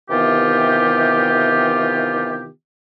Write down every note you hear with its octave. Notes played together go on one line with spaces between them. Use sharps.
C3 D#3 E3 B3 F4 G4